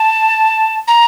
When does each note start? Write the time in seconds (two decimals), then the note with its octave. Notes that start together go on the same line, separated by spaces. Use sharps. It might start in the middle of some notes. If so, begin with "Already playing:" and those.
Already playing: A5
0.88 A#5